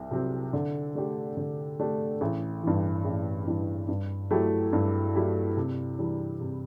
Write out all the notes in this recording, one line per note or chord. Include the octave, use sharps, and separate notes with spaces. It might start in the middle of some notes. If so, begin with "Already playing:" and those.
Already playing: C2 C3
C3 F#3 C4
D3
A3 D4 G4
D3
A3 D4 G4
A1
G2 E3
A1
G2 E3
G2
F#3 A3 E4 G4
G2
F#3 A3 E4 G4
C3
E3 G3 D4
C3